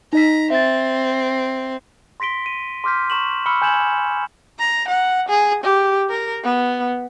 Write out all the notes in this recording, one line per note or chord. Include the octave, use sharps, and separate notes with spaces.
D#4 D#5 A#5 B6
C4 E5 A6
C6 A#6 B6 D7 G7
D#7
C6 D6 F6 G6 B6
A#5 C#6 E7 F#7
B5 C#6 E6 F6 C#7 G7
G#5 G6 G#6 E7 F#7
A#5
F#5
G#4
G4
A#4
B3